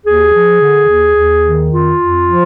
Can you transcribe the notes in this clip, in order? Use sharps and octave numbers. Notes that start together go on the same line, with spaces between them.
D#2 G#4
F3
D3
D#2
D#2
D#3
F2 F4
F2
F3